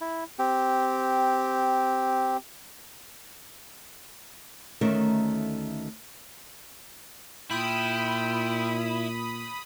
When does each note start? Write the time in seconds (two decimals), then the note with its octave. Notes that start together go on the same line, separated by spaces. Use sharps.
0.01 E4
0.39 C4 G4
4.81 D2 D#3 A3 C#4 A#4
7.51 A#2 E4 F4 G5 B5 D#6